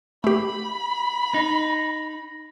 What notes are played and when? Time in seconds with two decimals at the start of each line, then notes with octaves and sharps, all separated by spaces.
0.24 A3 G4 B5
1.34 D#4